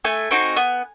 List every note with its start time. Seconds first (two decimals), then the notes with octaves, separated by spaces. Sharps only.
0.05 A3 G#5
0.31 C4 D#4 F#4
0.56 B3